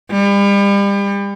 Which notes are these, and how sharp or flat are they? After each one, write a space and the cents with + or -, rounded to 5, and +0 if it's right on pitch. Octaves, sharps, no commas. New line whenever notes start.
G3 +35